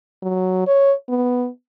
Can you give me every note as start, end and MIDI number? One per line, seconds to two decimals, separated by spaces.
0.23 0.66 54
0.67 0.93 73
1.09 1.48 59